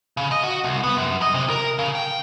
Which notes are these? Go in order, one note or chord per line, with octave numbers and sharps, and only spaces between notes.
C#3
D#5
F#4
C2
B3
F#2
D#5
C3
A#4
C#3
G5